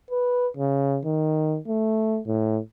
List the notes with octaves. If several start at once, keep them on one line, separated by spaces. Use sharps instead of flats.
B4
C#3
D#3
A3
A2